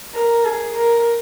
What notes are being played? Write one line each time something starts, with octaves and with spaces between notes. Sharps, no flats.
A#4
G#4
A#4